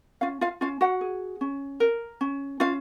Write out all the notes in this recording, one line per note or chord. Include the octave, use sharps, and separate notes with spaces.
C#4 F4 F5
F4 F5
C#4 F4 F5
F#4 F#5
G#4
C#4
A#4
C#4
C#4 F4 F5